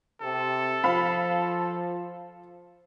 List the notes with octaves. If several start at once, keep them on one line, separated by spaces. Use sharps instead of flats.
C3 A4
F3 C5 F5 B5